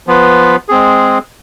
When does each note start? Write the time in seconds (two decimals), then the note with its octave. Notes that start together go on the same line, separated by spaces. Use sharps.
0.07 F3 B3 F4 B4
0.69 G#3 C4 G#4